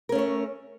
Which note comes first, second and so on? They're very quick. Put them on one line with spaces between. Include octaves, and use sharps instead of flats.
A#4 C#4 A3 C#5